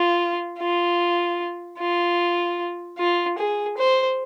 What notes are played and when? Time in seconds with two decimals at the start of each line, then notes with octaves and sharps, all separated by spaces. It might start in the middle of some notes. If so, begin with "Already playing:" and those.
Already playing: F4
0.59 F4
1.78 F4
2.98 F4
3.38 G#4
3.77 C5